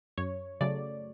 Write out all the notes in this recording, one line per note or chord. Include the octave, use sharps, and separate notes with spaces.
F#2 C#5
C#3 F#3 A3 D5